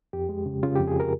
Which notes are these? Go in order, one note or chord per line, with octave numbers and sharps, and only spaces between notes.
F2 G4
G#3
C#3
C#3 F4
F2 G4
G#4
A#4